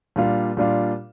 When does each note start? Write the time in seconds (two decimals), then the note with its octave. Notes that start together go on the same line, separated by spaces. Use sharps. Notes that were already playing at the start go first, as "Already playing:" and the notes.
0.16 A#2 G3 D4 F4
0.57 A#2 G3 D4 F4